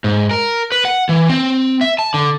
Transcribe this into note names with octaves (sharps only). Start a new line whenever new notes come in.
G#2
A#4
B4
F#5
E3
C4
E5
A5
D3